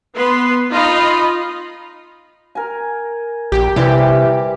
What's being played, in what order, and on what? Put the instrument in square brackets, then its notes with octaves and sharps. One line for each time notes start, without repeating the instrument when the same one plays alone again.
[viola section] B3 B4 C6
D#4 F4 D#5 F5 B5
[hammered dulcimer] A#4 G#5
[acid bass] A#1 [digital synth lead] G4
[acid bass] C3 [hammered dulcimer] E3 G3 [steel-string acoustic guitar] E4 B4 D5 [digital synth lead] G4